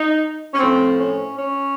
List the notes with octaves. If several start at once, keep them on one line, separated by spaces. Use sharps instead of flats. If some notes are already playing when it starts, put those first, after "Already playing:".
Already playing: D#4
C#4
A2 F3 C4
C#4
C#4